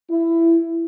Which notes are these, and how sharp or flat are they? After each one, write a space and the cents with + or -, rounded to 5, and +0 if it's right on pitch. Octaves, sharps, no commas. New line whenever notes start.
E4 +15